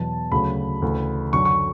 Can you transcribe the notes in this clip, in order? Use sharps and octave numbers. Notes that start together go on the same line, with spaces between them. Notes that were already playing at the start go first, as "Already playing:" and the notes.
Already playing: E2 B2 F#3 A5
D2 C#3 F#3 B5
D2 C#3 E3
F#2 D3 F#3 C#6
C#6